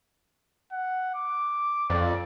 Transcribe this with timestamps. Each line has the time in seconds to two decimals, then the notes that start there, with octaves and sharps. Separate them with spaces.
0.72 F#5
1.15 D6
1.90 F2 D5